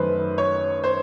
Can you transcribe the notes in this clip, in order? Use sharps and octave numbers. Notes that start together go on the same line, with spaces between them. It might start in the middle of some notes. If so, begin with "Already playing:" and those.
Already playing: F#2 D#3 F#3 A3 B4 C5
C#5
C5